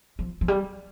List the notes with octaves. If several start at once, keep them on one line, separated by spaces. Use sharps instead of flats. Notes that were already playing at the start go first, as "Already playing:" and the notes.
F3
F3
G3